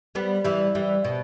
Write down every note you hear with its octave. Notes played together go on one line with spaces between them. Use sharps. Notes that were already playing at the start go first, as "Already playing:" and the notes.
G3 B3
E3 G3
E3 G3
B2